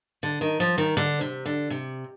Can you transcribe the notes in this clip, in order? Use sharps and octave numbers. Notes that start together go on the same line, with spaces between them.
D3
D#3
F3
D#3
D3
C3
D3
C3